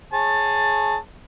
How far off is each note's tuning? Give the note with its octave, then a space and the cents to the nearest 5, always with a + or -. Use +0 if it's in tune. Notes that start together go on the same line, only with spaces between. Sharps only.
G#4 +15 C#5 -15 A5 +15